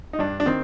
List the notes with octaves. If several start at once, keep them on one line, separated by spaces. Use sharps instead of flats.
D#4
G2 D4
D4
D#3 C4